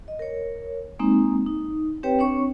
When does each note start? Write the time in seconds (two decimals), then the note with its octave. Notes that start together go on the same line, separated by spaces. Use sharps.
0.08 D#5
0.19 A#4 C#5
0.99 G#3 A#3 C4 D#4
1.47 D#4
2.03 C4 G4 B4 C#5 G5
2.19 C4 D4 C#5 C#6